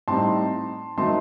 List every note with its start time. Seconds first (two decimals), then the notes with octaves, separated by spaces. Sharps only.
0.08 A2 G3 C4 D#4 A5 C6
0.97 D#3 F#3 A3 C4 D#4 A5 C6